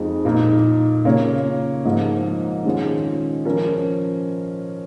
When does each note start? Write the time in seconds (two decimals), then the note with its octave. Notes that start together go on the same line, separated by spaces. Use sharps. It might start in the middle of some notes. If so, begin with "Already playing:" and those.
Already playing: F2 F3 G#3 D#4
0.25 A#2 A#3 D#4
1.05 C#3 A#3 F4 C#5
1.85 G#2 F3 A#3
2.65 D#3 G#3 C#4 F4
3.45 F3 C#4 A#4